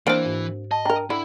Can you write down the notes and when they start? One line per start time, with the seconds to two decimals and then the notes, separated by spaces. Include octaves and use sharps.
0.07 E3 A#3 C4 D4 C5 D7
0.25 G#2
0.71 D#5 A5
0.85 D4 A#4 G5 A#5
1.10 D3 E4 B5